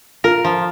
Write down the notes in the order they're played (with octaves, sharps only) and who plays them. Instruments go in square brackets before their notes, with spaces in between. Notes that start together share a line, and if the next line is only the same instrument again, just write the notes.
[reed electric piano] F4 [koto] A#4
[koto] F3